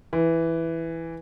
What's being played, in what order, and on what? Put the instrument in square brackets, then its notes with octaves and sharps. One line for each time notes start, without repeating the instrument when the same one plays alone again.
[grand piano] E3